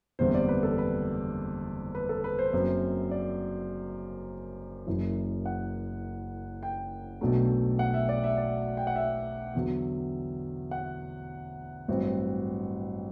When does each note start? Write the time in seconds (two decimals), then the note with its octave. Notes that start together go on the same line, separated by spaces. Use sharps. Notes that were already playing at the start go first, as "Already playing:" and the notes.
0.19 F#1 E2 D3 G3 C4 C5
0.34 D5
0.49 B4
0.63 A4
0.78 B4
1.95 B4
2.09 A4
2.24 B4
2.39 C5
2.53 F#1 F#2 F#3 C4
3.11 D5
4.87 F#1 F#2 E3
5.46 F#5
6.63 G5
7.21 B1 B2 F#3 A3 D4
7.79 F#5
7.94 E5
8.09 D5
8.24 E5
8.37 D5
8.77 G5
8.87 F#5
8.96 E5
9.55 E2 D3 F#3
10.71 F#5
11.88 A1 G2 F#3 C4